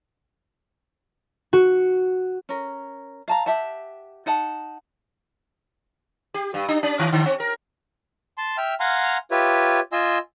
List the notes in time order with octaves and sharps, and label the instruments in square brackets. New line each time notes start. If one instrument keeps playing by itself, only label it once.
[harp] F#4
[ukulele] C#4 A#4
F5 A5 A#5
G4 E5 F#5 A5
D#4 F#5 A5
[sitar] G4
G2
D4
C#4
D#3
D3
C4
A#4
[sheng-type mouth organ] A5 C6
E5 G5 F6
F5 F#5 G#5 A#5 C6 F6
F4 G4 B4 C#5 E5
F4 D#5 G#5 C6 E6